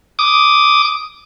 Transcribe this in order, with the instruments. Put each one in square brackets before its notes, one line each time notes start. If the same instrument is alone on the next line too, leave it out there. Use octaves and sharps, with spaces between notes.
[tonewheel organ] D6 D#6